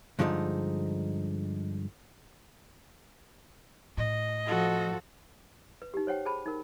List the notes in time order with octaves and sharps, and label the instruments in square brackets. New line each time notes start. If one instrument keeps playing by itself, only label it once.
[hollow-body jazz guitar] G2 D3 F3 G#3 B3 D#4
[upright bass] A2 [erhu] D#5
[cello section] F3 [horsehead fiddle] F#4 A4
[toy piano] B4
D#4 G4
C5 C#5 F#5 G5
G#4 C5 A5 B5
D#4 A#4